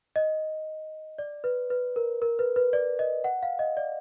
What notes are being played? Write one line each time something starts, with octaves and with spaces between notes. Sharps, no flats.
D#5
D5
B4
B4
A#4
A#4
B4
B4
D5
D#5
F#5
F5
D#5
D5